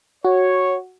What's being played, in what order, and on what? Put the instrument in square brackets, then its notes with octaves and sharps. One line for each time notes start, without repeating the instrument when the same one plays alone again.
[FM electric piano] F#4 [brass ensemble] C#5